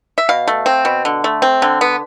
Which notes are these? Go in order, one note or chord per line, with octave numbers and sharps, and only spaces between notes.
E5
B2 F5
A3
C4
B2
D3
A3
C4
D3
B3